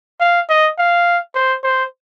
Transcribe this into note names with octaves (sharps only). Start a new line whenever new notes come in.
F5
D#5
F5
C5
C5